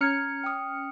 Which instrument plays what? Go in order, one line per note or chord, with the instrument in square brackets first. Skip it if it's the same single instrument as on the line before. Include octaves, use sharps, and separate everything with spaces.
[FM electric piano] C#4 F6 C#7 [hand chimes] A#5 G#6
[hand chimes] G5 D#6